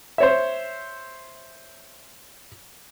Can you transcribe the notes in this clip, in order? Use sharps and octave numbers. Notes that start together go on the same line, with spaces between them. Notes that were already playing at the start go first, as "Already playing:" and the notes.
C5 C#5 E5